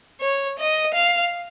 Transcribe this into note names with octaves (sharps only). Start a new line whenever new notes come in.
C#5
D#5
F5